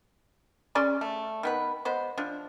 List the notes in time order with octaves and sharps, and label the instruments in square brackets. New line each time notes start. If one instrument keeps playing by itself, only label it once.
[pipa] C#4 G#4 D5 C6
A3
D#3 B3 B4
G#3 B3 C5
F3 D4